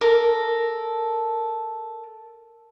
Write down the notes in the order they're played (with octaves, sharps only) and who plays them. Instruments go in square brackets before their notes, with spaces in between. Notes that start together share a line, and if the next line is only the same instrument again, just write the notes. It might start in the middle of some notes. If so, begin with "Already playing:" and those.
[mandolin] A4 A#4